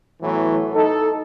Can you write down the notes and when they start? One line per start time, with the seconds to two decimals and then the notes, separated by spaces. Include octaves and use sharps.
0.22 A2 E3 F#3 A3 B3
0.74 D#4 A4